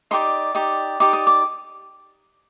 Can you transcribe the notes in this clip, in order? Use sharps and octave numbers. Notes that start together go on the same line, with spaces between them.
D#4 G4 D5 C6
D#4 G4 D5
D#4 G4 D5 D6
D#6
D6